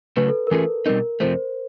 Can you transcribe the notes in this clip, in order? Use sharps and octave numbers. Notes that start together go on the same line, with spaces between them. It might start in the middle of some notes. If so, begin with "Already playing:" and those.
C#3 F#3 A3 B4
A4
A#4
E3 A3 C#4 F4 G#4 A4
B2 G3 C4 D#4 A#4
F2 C3 F3 A3 C5